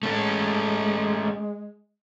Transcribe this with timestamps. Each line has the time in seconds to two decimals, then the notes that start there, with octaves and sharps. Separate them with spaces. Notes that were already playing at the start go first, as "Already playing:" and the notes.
0.03 G#3 A3 C#4 A4